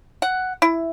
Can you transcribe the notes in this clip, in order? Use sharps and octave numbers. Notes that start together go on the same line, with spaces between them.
F#5
E4